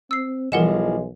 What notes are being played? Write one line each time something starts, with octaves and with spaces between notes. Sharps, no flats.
C4 E6 C7
B1 E3 F3 G3 G#3 A#4 F#5 E7